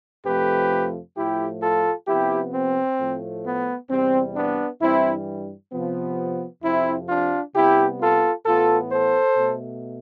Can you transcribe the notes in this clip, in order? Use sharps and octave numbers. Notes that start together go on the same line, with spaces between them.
F2 C3 F3 A3 G4 B4
A2 F3 A3 E4 G4
F4 A4
C3 F3 B3 E4 G4
C4
A2 F3 A3
B3
E2 C3 G3 C4
B3 D4
G2 E3 G3 C4 E4
C3 F3 B3
F2 C3 F3 C4 E4
D4 F4
C3 G3 B3 E4 G4
F4 A4
A2 E3 B3 F4 A4
A4 C5
B2 A3